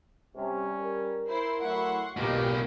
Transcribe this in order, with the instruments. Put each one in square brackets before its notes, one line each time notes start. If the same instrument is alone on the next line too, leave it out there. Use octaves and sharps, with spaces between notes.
[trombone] C3 [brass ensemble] G3 C#4
[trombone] A#4
[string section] E4 C5 C7
[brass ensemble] F#3 A3 E4 [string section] F#5 C6 C#6
[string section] B1 D#4 [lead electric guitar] B2 A#3 [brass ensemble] G4